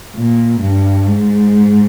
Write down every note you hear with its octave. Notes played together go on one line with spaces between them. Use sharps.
A#2
G2
G#2